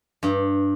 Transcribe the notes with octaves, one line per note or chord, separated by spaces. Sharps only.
G2